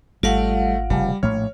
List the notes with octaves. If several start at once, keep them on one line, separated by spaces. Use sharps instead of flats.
G#1 G3 A3 F4 F5 F#5 A#6 D7
F1 C#3 G3
A#1 A2 A3 C#5 F6